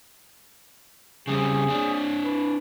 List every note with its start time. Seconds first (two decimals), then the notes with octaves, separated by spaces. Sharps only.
1.27 C#3 G3 C4 G#4
1.69 C4 D4
2.24 B4